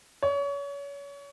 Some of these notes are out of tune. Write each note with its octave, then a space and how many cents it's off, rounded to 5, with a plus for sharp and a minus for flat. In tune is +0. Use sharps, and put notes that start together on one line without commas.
C#5 +30